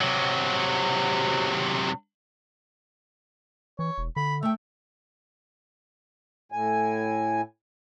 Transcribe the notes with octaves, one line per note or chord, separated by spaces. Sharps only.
C3 F#3
E3 C#5
E1
D3 B5
A3 E5 G5
A2 G#5